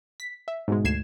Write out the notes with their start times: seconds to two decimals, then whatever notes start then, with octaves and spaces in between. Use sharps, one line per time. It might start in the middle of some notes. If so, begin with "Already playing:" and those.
0.20 B6
0.48 E5
0.68 G#2 B2 G#3
0.84 D2 G#6 C7 E7